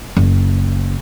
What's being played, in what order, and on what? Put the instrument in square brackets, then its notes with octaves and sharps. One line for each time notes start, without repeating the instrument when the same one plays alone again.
[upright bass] F#1